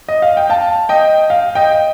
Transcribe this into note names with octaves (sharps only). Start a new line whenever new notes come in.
D#5
F5
G5
F5 A5
D#5 G5
F5
D#5 G5